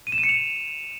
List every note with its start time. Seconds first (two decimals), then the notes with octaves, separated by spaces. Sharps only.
0.07 D#7
0.12 E7
0.18 D#7
0.24 C#7
0.29 F7